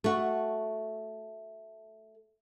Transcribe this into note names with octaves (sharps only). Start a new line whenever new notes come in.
A3 F#4